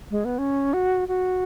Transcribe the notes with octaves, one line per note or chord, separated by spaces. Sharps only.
G#3
B3
C#4
F#4
F#4